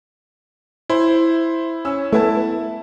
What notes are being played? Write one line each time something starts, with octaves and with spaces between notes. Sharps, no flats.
E4 C5
C#4 E6
A3 B3 E4 E5 A5